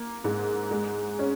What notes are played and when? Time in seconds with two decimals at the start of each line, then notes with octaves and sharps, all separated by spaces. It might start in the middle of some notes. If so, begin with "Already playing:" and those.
Already playing: A#3
0.24 G#2
0.71 G#3
1.19 C#4